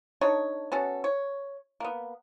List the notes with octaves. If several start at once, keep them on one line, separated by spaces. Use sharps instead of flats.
D4 D#4 A4 C#5
B3 C#4 F#4 A4
C#5
A#3 B3